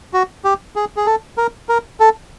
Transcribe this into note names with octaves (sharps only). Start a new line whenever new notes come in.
F#4
G4
G#4
G#4
A4
A#4
A#4
A4